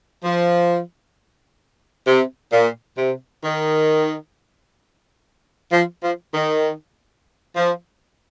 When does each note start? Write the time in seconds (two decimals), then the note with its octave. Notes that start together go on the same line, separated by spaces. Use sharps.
0.24 F3
2.07 C3
2.53 A#2
2.98 C3
3.44 D#3
5.72 F3
6.04 F3
6.34 D#3
7.56 F3